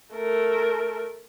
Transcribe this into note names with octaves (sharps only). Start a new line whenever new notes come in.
A3 A#4